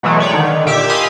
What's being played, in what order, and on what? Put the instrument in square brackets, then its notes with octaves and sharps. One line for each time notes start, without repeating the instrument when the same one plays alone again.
[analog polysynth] B2 E3 F#3 G#3 A3 B3
B4 C#5 D5 G5
D3 D#3
A#2 G4 E5 D6 E6
D#5 F5 G#5 B5 C6 D#6